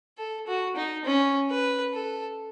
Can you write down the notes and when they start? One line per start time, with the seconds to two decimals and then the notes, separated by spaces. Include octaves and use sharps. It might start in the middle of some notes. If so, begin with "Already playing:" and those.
0.18 A4
0.47 F#4
0.76 D#4
1.05 C#4
1.50 B4
1.93 A4